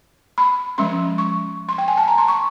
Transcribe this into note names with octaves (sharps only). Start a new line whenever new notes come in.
B5
F3 G#3 C#4 C6
C#6
C6
G5
G#5
A5
A#5
C6
C#6